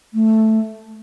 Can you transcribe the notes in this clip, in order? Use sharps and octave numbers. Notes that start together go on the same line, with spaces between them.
A3